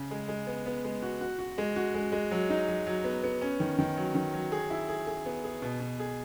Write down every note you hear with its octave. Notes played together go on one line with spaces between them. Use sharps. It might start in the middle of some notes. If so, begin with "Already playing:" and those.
Already playing: C#3
G#3
G#3
B3
B3
G#3
F#4
F#4
F#4
G#3
F#4
G#3
G#3
F#3
D#4
F#3
F#3
B3
B3
C#4
D#3
D#3
F#3
D#3
F#3
G#4
E4
G#4
G#4
B3
G#4
B2
B2
G#4